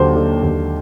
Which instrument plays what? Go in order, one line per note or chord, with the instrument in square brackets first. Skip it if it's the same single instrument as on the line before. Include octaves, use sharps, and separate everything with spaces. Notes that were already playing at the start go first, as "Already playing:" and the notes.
Already playing: [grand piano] D#2 D3 F#3 [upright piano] C5
[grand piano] D3
D#2